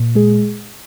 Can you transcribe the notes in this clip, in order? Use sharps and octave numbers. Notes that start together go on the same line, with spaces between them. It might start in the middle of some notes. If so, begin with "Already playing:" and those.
Already playing: A#2
G#3 G#4